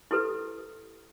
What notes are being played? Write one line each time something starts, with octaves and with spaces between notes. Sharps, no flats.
E4 G4 A4 B4